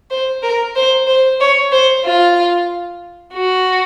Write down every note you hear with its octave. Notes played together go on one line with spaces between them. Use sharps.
C5
A#4
C5
C5
C#5
C5
F4
F#4